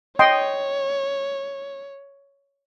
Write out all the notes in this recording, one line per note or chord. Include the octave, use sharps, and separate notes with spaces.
C#5 D#5 G5 C6